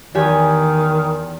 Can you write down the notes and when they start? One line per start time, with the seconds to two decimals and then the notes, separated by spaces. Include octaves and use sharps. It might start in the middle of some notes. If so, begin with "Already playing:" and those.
0.15 E2 D#3 G4 G#5